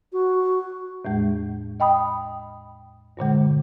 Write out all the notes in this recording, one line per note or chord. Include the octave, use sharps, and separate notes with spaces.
F#4
E2 A2 G#3
D#5 G5 B5 D#6
G2 A#2 D3 G#3